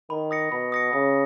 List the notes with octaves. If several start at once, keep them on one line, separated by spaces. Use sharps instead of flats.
D#3 B5
D#6 A#6 C#7
B2 B5
D#6 A#6 C#7
C#3 D#6